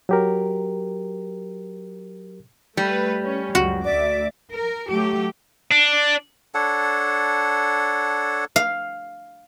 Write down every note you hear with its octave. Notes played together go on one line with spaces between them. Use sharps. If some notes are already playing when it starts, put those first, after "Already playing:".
F#3 G4 A#4
G3 A3 B4
C#4
C#2 F#2 F#4
D2 D5 E5 D6
A#4
F#3 A3 G4
D4
D4 A4 C#5 F#5
F5